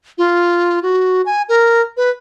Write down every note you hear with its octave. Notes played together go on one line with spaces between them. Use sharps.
F4
F#4
G#5
A#4
B4